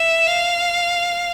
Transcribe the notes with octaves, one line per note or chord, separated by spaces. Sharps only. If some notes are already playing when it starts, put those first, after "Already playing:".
Already playing: E5
F5